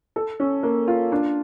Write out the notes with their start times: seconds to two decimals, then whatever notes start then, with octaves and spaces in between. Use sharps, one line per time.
0.16 A4
0.40 C#4
0.63 A#3
0.88 F4
1.12 D4